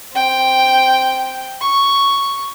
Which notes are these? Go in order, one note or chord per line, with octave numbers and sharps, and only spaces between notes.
C4 G5
C#6